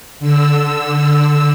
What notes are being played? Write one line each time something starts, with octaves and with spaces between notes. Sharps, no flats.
D3 E6